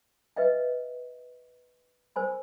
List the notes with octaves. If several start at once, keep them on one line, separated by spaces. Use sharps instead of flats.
B4 D#5 E5 G5
A#4 C5 G#5 B5